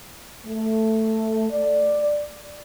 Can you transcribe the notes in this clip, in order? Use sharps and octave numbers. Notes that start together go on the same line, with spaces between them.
A3
D5